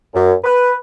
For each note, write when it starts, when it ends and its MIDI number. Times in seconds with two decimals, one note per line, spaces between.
0.15 0.33 42
0.44 0.74 71